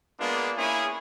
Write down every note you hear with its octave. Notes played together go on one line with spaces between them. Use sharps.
G#3 A#3 B3 D4 F4
A#3 C#4 E4 G#4